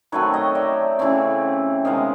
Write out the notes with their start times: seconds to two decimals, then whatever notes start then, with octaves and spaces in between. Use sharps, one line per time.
0.12 D#3 F#3 A3 C4 B4 C#5
0.33 C#5 D#5
0.55 D5 E5
0.99 C#3 E3 A3 C4
1.85 C3 D#3 G#3 B3 D#5 F5